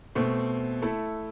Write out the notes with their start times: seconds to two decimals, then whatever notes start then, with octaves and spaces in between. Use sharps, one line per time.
0.15 B2 A3 C4
0.82 A3 E4 A4